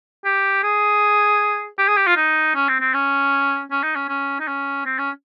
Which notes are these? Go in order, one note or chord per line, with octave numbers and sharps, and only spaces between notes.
G4
G#4
G4
G#4
G4
F4
D#4
C#4
C4
C4
C#4
C#4
D#4
C#4
C#4
D#4
C#4
C4
C#4